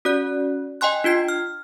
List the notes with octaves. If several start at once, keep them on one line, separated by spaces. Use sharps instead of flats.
C#4 F#4 D5 F#6
D#5 G5 G#5 C6 F#6
D4 F4 G#6 C7
F6